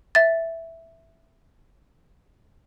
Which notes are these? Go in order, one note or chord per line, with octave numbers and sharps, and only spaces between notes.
E5 A6